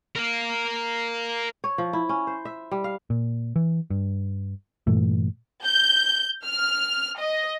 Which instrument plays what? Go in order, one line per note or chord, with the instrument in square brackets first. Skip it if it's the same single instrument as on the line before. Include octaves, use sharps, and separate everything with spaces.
[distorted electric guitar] A#4 F5
[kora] C#5
F3
E4
C#4
C5
E5
G3
F5
[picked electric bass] A#2
E3
G2
G2 A#2 E3 A3
[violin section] G6
F6
D#5